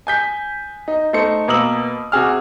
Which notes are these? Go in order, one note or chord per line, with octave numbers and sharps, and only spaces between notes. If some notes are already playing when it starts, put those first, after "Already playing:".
G#5 G6 B6
D#4
A3 D#4 C5 C#7
B2 A#3 D#6 E6 F#7
C3 F#4 G#4 F6